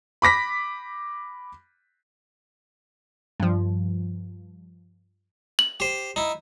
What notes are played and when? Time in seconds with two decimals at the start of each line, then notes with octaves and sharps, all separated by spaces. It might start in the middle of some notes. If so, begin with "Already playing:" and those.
0.22 B5 D6 A#6 B6
3.40 G2 F3
5.59 F#7
5.80 G4 C5
6.16 D#4 E4